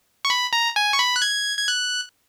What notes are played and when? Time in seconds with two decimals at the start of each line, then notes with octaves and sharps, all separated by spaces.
0.25 C#6
0.30 B5
0.53 A#5
0.76 G#5
0.93 C#6
0.99 B5
1.16 F#6
1.22 G#6
1.58 G#6
1.68 F#6